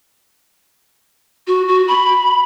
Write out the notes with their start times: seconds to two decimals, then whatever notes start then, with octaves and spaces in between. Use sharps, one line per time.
1.47 F#4
1.68 F#4
1.88 B5